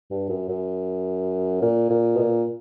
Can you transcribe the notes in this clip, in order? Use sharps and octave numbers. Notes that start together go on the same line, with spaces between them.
G2
F#2
F#2
A#2
A#2
B2
A#2